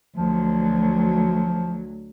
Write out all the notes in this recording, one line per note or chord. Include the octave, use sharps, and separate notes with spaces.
D2 F3 F#3